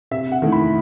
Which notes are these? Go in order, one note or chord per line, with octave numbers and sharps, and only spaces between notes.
C3 E5
F#5
D#3 A3 E4
B5